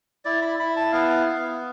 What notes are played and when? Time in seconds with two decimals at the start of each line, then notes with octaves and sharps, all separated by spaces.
0.25 E4 D5
0.42 B5
0.59 E4 B5
0.77 A5
0.92 B3 F5
1.26 B3